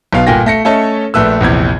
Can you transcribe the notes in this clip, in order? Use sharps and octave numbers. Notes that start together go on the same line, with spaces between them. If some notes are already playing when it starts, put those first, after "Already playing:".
B1 B2 F5
G1 A#2 G5 G#5 A#6
A3 A#6 C#7
A3 C#4 A4 C#5 D#5 E5
A#1 A3 B4 E6
A#1 E2 C3 G#6